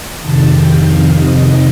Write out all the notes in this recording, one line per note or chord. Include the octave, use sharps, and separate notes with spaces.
F2 C3 D#3 A5
G5
F5
D#5